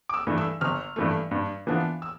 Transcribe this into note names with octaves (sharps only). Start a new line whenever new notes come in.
D6
E6
G2 E3 A3
E6
G1 F6
G2 E3 A3
G2
E3 B3 D4 F4
E6